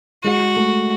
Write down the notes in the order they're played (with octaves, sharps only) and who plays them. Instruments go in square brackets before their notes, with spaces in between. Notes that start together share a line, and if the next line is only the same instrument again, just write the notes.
[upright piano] G#3 [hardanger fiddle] F#4
[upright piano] A3